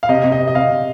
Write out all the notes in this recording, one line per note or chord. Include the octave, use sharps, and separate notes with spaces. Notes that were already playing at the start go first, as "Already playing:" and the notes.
F5
C3 D#5
C3
D#5
C3
D#5
C3 F5
C3